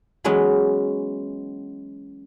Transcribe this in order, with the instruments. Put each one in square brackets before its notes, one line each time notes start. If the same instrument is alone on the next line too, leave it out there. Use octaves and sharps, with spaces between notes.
[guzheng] E3 F#3 G#3 B3 C#4